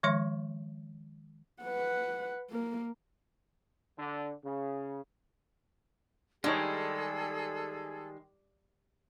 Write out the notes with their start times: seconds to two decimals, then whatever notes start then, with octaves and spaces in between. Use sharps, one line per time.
0.03 D#3 F3 G#3 C#5 E5 C6
1.63 B4 F#5
2.51 A#3 A#4
3.98 D3
4.44 C#3
6.44 D#3 G3 G#3 D4 D#4 G#4 A4 C#5